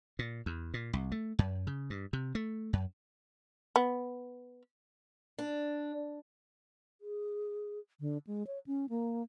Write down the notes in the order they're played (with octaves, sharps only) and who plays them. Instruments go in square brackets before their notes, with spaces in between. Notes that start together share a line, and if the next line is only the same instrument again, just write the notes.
[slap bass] A#2
E2
A#2
C2
A3
F#2
C#3
G2
C3
A3
F#2
[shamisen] B3
[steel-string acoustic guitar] D4
[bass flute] G#4
D3
G#3
C#5
C#4
A#3